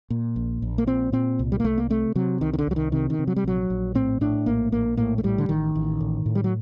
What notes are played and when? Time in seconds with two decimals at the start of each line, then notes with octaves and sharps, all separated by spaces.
0.10 A#2
0.36 A#1
0.62 A#1
0.78 A#3
0.87 A#2 C4
1.12 A#2 C4
1.39 C2
1.52 G3
1.60 A#3
1.64 C2 A3
1.78 A#3
1.90 C3 A3
2.15 C3 F#3
2.41 C2 D#3
2.53 D#3
2.59 D3
2.67 C2 F#3
2.76 D#3
2.92 C3 D#3
3.10 D#3
3.19 C3
3.27 F#3
3.36 G3
3.44 A#1 F#3
3.70 A#1
3.95 A2 C4
4.21 A2 D4
4.46 A#1 A#3
4.72 A#1 A#3
4.97 A2 A#3
5.18 A3
5.23 A2 G3
5.38 D3
5.49 A1 D#3
5.75 A1
6.01 A2
6.26 A2
6.35 G3
6.44 F#3